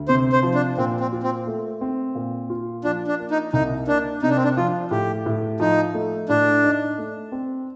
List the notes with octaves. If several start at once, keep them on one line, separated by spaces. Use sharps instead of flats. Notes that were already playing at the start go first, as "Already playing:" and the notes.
Already playing: D2
C3 C5
C5
F3
D4
A#2 C4
C4
F4
C4
A3
C4
A#2
F4
F3 D4
D4
A#3
D#4
C2 D#4
A#3 D4
C3 D#4
D4
C4
D4
F3 F4
A2 G4
A2
F3 D#4
A3
A2 D4
D#4
A3
C4